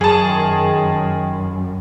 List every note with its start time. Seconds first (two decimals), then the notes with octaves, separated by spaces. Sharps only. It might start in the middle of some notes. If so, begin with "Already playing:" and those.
0.01 F#2 G#4 A5
0.23 D#3